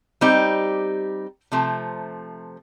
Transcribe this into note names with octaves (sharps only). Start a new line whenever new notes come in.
G3 C4 D#4 G4
C3 F3 A3